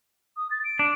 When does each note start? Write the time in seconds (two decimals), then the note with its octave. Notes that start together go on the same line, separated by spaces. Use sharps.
0.37 D#6
0.51 A6
0.65 D7
0.79 D4